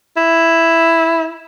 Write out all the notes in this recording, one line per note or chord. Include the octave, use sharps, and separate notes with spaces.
E4